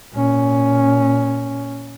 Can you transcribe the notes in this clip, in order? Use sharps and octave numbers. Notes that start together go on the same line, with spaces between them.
A#2 C#4